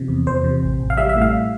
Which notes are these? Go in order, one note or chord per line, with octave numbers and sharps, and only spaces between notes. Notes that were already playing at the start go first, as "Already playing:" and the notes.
Already playing: C3 F3
E2
E2 C5
C3
A1
A1
F5
G3 E5
E5
A2
F5